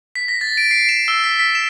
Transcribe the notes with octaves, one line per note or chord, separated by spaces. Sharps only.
B6
A#6
A6
D7
C7
E7
E6
B6
B6
E7